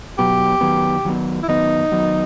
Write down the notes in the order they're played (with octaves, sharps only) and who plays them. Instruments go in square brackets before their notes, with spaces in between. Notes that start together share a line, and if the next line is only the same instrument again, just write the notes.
[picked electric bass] B2 F#3 B3 [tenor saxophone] G4
[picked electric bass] D#3 F#3 B3
D#3 F#3 B3
[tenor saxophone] E4
[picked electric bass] D#3 F#3 B3 [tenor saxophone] D#4
[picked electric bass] D#3 F#3 B3